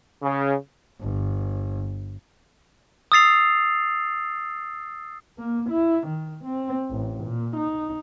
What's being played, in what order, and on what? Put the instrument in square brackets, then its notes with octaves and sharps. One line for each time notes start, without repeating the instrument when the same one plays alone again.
[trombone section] C#3
[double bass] G1
[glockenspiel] D#6 E6 A6 C7 F7
[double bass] A#3
E4
D#3
C4
A1
A#2
D#4